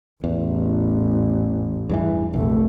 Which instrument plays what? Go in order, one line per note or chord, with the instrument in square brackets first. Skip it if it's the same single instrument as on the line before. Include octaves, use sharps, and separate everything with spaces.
[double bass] A1 [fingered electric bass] E2
[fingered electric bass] E2 G2 E3
[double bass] F1 A3 [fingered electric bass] A#1